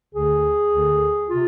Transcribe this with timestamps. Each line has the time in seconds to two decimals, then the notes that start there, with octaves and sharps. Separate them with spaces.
0.12 D2 D3 G#4
0.71 D2 D3
1.29 C3 F4